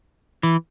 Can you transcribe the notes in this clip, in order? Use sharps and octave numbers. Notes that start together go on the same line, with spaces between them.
E3